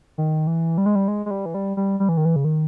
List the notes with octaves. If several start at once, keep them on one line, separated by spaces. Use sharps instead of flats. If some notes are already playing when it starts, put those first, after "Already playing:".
D#3
E3
G3
G#3
G3
G#3
G#3
G3
E3
G3
G3
G3
E3
D#3
E3
C#3
D#3